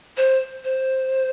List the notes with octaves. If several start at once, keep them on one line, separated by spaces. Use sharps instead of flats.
C5
C5